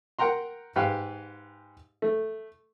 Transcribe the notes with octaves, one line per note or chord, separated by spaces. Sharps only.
A#4 F#5 G5 A#5 C6
G#2 G4 B4 F5
A3